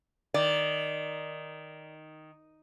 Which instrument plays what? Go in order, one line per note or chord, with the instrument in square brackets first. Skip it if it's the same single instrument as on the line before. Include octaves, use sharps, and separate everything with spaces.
[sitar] D#3 [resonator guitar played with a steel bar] D5